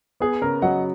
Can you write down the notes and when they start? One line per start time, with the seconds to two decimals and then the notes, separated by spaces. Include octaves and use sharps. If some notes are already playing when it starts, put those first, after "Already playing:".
0.20 B3 G#4
0.42 C#3 A#4
0.62 F#3 D#5 F#5